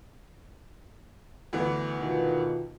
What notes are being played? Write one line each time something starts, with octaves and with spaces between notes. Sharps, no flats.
D2 E3 B3
B2 D#3 F4